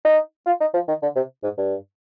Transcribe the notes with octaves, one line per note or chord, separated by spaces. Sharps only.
D#4
F4
D#4
F3
D#3
D3
C3
G#2
G2